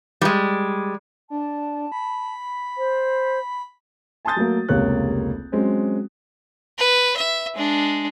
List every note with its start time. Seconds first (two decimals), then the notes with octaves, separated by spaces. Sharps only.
0.21 G3 G#3
1.30 D4 A5
1.92 B5
2.78 C5
4.25 G#5 A5 C6 D#6 G6 A6
4.36 F#3 A3 A#3
4.69 F1 C#2 C3 A#3 C#5 F#6
5.52 F#3 G#3 C4 C#4
6.78 B4
7.17 E5
7.55 G#3 D4